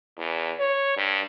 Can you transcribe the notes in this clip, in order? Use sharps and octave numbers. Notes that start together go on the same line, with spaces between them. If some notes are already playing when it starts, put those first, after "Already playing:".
E2
C#5
G2